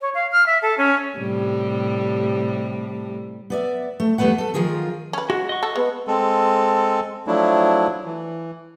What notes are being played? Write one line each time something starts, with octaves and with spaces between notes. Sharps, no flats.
C#5
F5
F6
E5
A4
C#4
A2 C3 G3
B3 D5 E5
A3
E2 G3 A3 B3 B4 F#5
A4
D#3 F3 F4 G#4 A#4
C#4 B4
G#3 F#4 F#5
D#5 F#5 C#6
A4
G#3 B3
G#3 C4 A4
F3 F#3 A3 D4 E4
E3